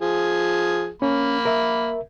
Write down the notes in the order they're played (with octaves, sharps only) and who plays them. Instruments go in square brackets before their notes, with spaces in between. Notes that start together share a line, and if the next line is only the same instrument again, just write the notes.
[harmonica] F3 G#4
[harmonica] A#3 B5 [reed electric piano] C#4
[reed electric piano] A#4 E5